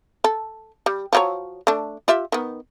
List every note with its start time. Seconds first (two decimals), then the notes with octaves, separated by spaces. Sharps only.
0.24 A4
0.86 G3
1.13 F3 F#3 C#5
1.67 A3 D4
2.08 F4 G4 E5
2.32 D#3 B3